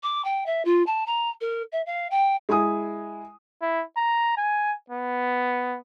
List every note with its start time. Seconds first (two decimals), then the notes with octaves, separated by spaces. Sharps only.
0.02 D6
0.24 G5
0.46 E5
0.64 F4
0.86 A5
1.06 A#5
1.40 A#4
1.72 E5
1.86 F5
2.10 G5
2.49 G#3 E4 G#5 D#6
3.62 E4
3.97 A#5
4.37 G#5
4.90 B3